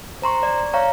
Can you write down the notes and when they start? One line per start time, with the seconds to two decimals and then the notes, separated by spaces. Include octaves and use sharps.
0.22 C5 A#5 C6 C#6
0.43 D5
0.73 C#5 F5 A#5 C#6